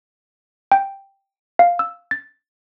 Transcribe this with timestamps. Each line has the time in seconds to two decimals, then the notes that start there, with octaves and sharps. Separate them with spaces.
0.72 G5
1.59 F5
1.79 E6
2.11 A6